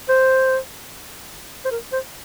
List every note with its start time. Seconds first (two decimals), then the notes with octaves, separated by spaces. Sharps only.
0.09 C5
1.65 C5
1.71 A#4
1.92 C5